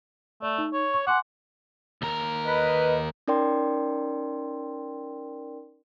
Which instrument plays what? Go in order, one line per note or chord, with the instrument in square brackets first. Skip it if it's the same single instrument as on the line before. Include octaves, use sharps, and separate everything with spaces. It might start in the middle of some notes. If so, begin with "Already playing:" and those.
[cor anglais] A3 [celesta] D5
[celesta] D#4
[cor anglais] C#5
[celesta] C#6
[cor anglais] F#5 [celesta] G#5 C6 D6
[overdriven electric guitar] D#2 A#4
[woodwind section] B4 [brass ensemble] D#5
[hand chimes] C#4 D#4 A#4 D5 G5 C6